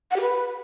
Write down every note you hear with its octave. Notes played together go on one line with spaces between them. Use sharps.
F#5
G4
B4